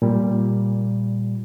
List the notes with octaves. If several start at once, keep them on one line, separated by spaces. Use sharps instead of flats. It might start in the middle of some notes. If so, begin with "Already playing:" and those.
A#2 G3